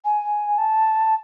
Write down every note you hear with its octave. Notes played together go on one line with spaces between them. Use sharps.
G#5
A5